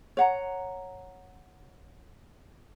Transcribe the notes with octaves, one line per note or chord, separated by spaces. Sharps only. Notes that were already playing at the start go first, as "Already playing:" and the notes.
C#5 F#5 A#5